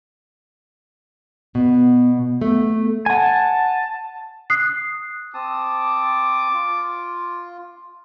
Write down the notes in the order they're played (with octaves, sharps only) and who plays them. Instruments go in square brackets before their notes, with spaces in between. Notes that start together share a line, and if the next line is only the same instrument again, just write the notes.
[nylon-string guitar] B2 [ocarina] B3
[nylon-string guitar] A3 [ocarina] B3
[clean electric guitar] F#5 G#5 [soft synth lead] A5
[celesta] D#6 F#6 C7
[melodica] C4 A5 D#6 [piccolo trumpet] D6
[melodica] F4